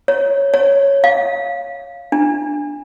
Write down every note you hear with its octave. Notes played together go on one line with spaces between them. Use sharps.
C#5
C#5
F5
D4